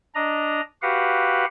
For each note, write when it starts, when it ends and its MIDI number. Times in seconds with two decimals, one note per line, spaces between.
0.15 0.61 62
0.15 0.61 75
0.15 0.61 82
0.82 1.45 66
0.82 1.45 67
0.82 1.45 71
0.82 1.45 77
0.82 1.45 78